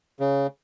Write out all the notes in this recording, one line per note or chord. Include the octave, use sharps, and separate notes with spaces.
C#3